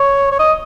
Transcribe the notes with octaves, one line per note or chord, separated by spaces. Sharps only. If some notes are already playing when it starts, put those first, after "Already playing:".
Already playing: C#5
C#5
D#5